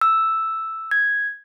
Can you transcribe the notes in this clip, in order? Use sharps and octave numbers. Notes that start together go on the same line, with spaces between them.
E6
G#6